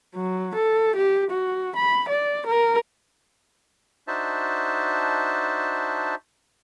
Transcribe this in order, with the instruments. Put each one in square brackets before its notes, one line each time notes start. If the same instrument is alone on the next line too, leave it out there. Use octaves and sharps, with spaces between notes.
[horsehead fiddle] F#3
A4
G4
F#4
B5
D5
A#4
[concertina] D4 D#4 F#4 C5 E5 A5